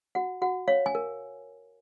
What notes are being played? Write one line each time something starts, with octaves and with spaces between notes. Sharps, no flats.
F#4 F#5
F#4 F#5
C#5 F5
G#5
A#4